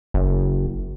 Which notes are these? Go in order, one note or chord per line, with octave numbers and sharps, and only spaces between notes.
F#1